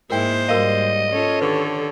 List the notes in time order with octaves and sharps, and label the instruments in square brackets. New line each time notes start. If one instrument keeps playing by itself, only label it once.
[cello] G#2 E4 [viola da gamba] G#3 A#3 C5 [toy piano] A#4 G5
[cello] G#2 G3 [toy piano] F#4 A#4 F5 [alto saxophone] D#5
[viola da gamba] C#4 F4 [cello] A4 C#5
[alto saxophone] D3 [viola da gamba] D#3 [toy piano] G4 B4